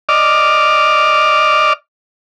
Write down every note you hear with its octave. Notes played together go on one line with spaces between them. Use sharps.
D5 D#5 D6 F6